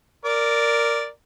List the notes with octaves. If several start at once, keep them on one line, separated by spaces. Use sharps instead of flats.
A#4 D5